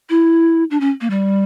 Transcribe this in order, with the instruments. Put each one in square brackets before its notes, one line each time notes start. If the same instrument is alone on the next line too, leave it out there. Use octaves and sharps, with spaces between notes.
[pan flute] E4
D4
C#4
A#3
G3